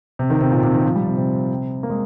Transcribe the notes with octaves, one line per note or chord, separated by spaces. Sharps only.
C3
D#3
C3
A#2
C3
D#3
F3
G3
C3
C3
A#3
G#3